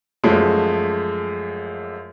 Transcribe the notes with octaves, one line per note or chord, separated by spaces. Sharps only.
F#2 F3 G#3 A3